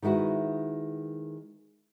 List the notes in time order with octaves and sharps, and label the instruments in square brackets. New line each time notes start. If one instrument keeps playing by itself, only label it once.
[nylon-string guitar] D#3 G#3 E4 F#4 B4